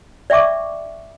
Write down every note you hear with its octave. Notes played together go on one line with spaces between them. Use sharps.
D5 E5 G5 C#6 D6